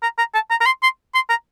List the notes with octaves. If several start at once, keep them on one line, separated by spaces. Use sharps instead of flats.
A#5
A#5
A5
A#5
A#5
C6
C6
C6
A#5